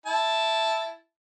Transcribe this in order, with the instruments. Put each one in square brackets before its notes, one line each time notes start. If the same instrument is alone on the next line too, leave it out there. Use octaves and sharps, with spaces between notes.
[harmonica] E4 A5